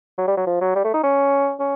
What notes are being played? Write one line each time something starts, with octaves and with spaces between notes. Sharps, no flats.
F#3
G3
F#3
F3
F#3
G3
A3
D#4
C#4
C#4